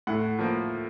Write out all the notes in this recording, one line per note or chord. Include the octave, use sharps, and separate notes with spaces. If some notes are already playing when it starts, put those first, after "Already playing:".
A2 F#5
F3 A#3